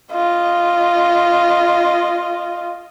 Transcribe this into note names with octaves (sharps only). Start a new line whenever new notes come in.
F4 D#5